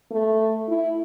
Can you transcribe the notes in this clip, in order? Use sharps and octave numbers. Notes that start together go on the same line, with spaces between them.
A3
E4